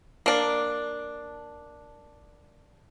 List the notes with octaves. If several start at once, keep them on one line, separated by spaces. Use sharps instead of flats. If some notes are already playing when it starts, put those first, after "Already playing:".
A#3 D4